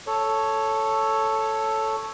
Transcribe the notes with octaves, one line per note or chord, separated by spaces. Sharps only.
A4 C#5